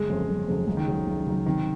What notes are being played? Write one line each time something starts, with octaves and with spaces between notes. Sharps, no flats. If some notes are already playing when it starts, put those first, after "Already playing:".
Already playing: G1 G#3
F2 C#3 F#3
G1
F2 C#3 F#3
C#2
D#3
C#3 F#3
C#2
C#3 F#3
C3 D#3